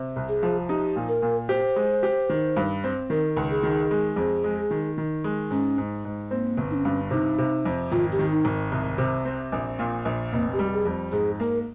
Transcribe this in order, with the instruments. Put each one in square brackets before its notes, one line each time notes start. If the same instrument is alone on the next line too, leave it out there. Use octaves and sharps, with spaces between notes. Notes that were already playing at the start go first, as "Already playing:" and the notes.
Already playing: [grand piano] C3
C2
[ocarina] G#4
[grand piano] F3
[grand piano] D#4 [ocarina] G4
[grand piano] A#2
[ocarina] A#4
[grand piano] A#2
[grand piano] G4 [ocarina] C5
[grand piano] G#3
G4
D#3
G2
C4
[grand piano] D#3 [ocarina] A#4
[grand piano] C#2
[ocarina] G#4
[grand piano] D#3
G#3
F2
G#3
D#3
D#3
G#3
[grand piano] G#2 [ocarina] C#4
[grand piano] G#2
G#2
[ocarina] A#3 [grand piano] C4
[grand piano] G1
[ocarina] D#4
C#4
[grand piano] G2
[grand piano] C3 [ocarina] D#4
[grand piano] C3
F2
[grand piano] G#1 [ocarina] F4
[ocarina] G4
[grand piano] D#3
[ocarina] D#4
[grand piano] G#1
C2
C3
C4
A#1
A#2
A#1
[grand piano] F1 [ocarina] A#3
[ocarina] G4
[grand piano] G3
[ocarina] G#4
[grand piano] F2
[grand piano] G#2 [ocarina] G#4
[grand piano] A#3 [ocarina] A#4